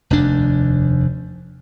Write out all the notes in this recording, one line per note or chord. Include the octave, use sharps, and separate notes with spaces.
F1 D#2 D4